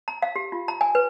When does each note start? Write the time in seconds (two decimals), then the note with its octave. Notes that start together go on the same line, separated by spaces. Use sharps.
0.08 A#5
0.22 F5
0.36 G4
0.52 F4
0.68 A#5
0.81 G#5
0.95 B4